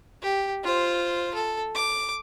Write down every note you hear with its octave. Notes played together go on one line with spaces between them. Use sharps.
G4
F4 C5
A4
D6